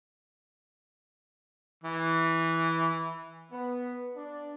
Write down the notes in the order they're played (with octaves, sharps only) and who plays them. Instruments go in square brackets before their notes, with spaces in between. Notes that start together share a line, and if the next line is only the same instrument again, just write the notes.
[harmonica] E3
[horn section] B3
D4